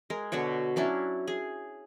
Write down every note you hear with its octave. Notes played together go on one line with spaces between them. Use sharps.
G#3 A#4
B2 D3 F#4 C#5
F#3 C#4 D4 E4
G#4